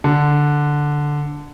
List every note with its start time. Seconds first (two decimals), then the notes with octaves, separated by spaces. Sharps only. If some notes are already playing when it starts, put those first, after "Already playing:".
0.04 D3